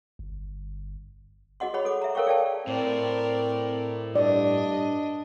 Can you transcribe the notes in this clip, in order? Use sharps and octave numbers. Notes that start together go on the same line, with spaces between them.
G1
F#4 G#4 D#5 F#5 C6
G#4 C#5 F#5 B5
A4 D6
E5 A#5
A4 A#4 C#5 F5 G5 C#6
G#4 D5 F5 G5 A5
A2 C4 A#4 D5
G2 D4 D5 D#5